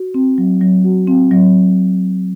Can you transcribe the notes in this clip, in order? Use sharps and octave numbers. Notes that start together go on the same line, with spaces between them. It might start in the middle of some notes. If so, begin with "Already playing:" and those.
Already playing: F#4
C4
F#3
F#3
F#4
C4
F#3